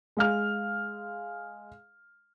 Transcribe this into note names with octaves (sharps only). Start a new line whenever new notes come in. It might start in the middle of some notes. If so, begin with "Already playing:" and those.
G#3 F5 F6